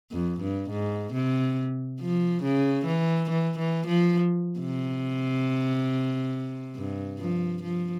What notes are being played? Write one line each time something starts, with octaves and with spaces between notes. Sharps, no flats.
F2
G2
G#2
C3
F3
C#3
E3
E3
E3
F3
C3
G2
F3
F3